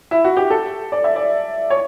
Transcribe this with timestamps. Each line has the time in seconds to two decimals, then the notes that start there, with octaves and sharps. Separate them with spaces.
0.11 E4
0.24 F#4
0.37 G4
0.50 A4
0.92 D5
1.04 E5
1.16 D5
1.70 C#5